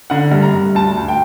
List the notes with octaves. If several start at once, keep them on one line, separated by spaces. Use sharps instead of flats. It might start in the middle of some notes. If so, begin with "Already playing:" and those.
D3 F#5
G2
A#5
G2
D2 A5
D2
G5